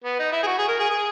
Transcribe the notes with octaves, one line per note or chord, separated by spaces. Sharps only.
B3
D#4
E4
G#4
F#4
G#4
A#4
G#4
G#4